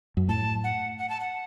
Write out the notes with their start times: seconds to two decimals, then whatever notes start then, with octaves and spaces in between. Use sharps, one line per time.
0.17 F#2
0.28 A2 A5
0.64 F#5
0.98 F#5
1.09 A5
1.20 F#5